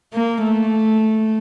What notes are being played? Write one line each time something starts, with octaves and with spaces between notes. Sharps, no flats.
A#3
A3